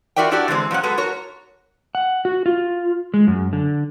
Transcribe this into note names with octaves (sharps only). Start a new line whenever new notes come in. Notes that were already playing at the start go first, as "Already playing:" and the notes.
F4 F#4 A#4 D5 E5 G5
D4 E4 F#4 G4 A4 D5
D3 E3 G#3 C4
A#2 F#3 C#4 F#5
G#3 B3 F#4 A4 B4
F#4 A#4 C#5
F#5
F#4
F4
G#3
F#2
D3